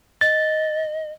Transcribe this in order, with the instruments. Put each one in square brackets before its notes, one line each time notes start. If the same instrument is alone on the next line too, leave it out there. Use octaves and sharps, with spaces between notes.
[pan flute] D#5 [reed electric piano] A6